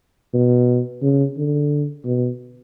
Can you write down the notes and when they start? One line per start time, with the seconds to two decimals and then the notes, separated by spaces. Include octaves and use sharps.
0.34 B2
1.02 C#3
1.37 D3
2.05 B2